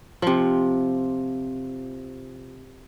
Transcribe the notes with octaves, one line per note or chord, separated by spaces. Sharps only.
C3 F3